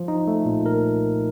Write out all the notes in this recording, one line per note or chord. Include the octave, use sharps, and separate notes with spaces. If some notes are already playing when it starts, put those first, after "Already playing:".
Already playing: F3
D#4
A3
A#2
A#4